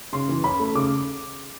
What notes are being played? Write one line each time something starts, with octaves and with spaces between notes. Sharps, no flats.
C#3 C6
E3
C#4 B5
A3
C#3 D6